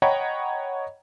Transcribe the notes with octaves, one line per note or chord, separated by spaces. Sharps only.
C#5 D#5 F#5 G5 A#5 B5